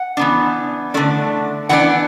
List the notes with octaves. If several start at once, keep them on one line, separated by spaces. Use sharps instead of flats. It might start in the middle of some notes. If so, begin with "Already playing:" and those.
Already playing: F#5
E3 B3 D4
D3 A3 D4
E3 B3 D4 F#5